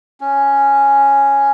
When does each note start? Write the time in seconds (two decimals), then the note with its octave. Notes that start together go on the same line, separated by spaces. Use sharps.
0.21 C#4